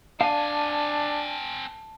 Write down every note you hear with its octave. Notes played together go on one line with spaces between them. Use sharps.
C4 D4 F5 G#5 A5